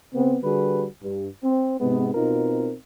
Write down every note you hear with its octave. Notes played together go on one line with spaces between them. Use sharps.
C#3 B3 C4
D3 G3 F#4 G#4 B4
G2
C4
G#2 C3 G#3 B3
B2 C4 D#4 F4 A#4